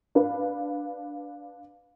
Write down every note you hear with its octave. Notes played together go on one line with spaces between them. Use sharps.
D4 B4 F5